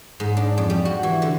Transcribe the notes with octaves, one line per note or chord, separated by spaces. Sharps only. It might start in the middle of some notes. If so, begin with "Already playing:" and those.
G#2
D4
F2
G3
F#4
E3
D3